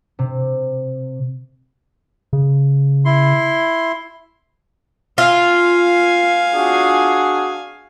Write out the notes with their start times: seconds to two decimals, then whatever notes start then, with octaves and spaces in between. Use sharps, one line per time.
0.19 C3
2.33 C#3
3.05 E4 C6
5.18 F4 F5 G#5
6.54 D4 F#4 G#4